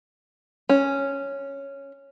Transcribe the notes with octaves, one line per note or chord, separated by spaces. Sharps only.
C#4